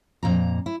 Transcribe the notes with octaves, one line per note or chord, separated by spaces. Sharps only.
F2 A#2 A#5
E4